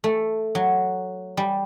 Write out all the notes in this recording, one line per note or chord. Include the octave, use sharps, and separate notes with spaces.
A3
F#3
G3